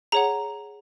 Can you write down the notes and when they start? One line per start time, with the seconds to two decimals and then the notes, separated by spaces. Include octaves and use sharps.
0.12 G#4 C#5 F#5 A#5